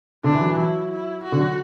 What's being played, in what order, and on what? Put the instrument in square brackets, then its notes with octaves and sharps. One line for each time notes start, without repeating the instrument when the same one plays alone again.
[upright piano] D3 [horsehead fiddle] D4
[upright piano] E3
F#3
E3
[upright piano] F#3 [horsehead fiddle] E4
[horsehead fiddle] E4
F#4
[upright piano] D3
F#3